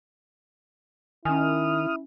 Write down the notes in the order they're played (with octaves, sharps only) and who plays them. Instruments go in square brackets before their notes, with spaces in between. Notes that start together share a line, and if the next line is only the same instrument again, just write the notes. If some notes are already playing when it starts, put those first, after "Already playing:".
[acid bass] D#3 [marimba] C#4 G#5 [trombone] E4 [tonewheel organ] D#6 F6